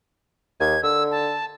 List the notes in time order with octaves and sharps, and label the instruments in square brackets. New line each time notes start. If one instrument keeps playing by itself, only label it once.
[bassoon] D#2 [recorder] G#6
[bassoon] D3 [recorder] E6
[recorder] A5